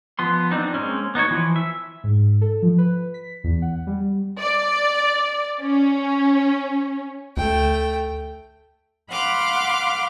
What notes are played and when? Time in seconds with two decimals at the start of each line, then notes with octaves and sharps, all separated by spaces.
0.19 F3 B3 C6
0.51 C4 D4 D#4
0.74 G#3 A#3 C4 C#4
1.15 B3 D#4 F#4 C#5
1.30 E3 F3
1.56 E5
2.04 G#2
2.41 A4
2.62 F3
2.78 B4
3.14 B6
3.44 E2
3.62 F#5
3.87 G3
4.40 D5
5.61 C#4
7.37 D2 A3 G5
9.11 F5 F#5 B5 C6 D6 F6